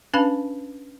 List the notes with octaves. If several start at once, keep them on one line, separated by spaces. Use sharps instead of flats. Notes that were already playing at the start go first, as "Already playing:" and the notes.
C#4 D4 B4 F5 A5 B5